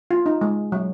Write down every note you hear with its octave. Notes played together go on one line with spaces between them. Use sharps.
F4
D#4
G#3
F#3